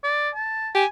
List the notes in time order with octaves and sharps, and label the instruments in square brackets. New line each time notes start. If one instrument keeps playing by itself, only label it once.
[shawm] D5
A5
[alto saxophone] G4 [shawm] G#5